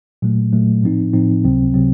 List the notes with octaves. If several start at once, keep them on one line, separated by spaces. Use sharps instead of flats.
A#2 F#3 A3
A#2 F#3 A3
A2 F3 C4 D#4
A2 F3 C4 D#4
C#2 C3 F#3 C4
C3 F#3 C4